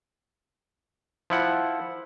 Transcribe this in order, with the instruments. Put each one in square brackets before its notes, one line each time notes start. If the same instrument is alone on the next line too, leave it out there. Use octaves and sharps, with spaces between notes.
[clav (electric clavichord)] F3 E4 F#5